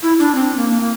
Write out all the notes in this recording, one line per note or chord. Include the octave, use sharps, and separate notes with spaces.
E4
D4
C4
A#3
A#3